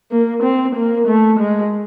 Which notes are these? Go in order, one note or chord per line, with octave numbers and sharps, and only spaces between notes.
A#3
C4
A#3
A3
G#3